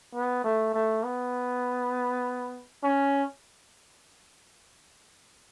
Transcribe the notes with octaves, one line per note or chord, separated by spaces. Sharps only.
B3
A3
A3
B3
C#4